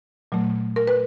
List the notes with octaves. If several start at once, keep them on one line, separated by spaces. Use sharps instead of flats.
A#2 F#3 A3
A#4
B4